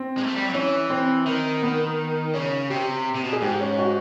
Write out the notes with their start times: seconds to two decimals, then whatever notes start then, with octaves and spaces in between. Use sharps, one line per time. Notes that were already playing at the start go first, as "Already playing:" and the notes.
Already playing: C4
0.17 G#3
0.23 A#3
0.26 A3
0.36 G3
0.45 F#3
0.54 E3 C#4
0.90 C4
1.26 D#3
1.62 B3
2.34 C#3 C#4
2.70 C3 G4
3.15 C3
3.24 B2
3.33 G#4
3.42 G#2 G4
3.60 C#4
3.78 F#4